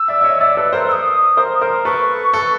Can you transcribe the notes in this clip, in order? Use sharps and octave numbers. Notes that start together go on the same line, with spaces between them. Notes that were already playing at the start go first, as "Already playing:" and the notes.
Already playing: E6
D5 E5
E5
C#5 D#5
D5 E5
A4 B4
A#4 C5
E6
D#6
A#4 C5
A#4 C5
A4 B4 C#6
A4 B4